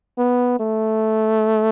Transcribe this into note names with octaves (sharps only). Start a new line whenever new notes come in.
B3
A3